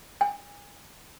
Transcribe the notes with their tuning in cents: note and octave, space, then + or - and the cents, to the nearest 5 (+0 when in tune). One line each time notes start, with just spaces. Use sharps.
G#5 -30